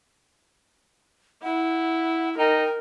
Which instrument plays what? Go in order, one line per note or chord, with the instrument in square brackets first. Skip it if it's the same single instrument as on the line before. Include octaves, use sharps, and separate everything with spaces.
[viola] E4 [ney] F#5
[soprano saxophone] D#4 [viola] A#4 [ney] G5